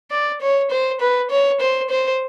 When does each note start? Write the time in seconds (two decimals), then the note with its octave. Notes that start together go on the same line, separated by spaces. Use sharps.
0.11 D5
0.41 C#5
0.71 C5
1.01 B4
1.31 C#5
1.60 C5
1.90 C5